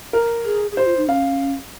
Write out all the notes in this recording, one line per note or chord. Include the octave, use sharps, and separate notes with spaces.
A#4
G#4
G#4
G4 C5
F4
D#4
C#4 F5